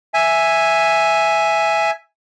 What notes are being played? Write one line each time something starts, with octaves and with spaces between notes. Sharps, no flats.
E5 G#5